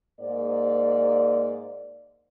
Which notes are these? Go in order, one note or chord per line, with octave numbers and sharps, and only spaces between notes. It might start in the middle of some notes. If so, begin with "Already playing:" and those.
G#2 A#3 C5 D5